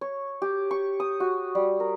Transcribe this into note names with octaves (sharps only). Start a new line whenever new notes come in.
C#5
G4
C#6
D#6
F#4
G3
A#4